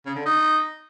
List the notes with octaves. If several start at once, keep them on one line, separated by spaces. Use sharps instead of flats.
C#3
D3
D#4